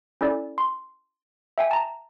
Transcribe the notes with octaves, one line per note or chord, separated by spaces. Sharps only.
C#4 E4 A4 D5
C6
E5 G5 G#5
A5 A#5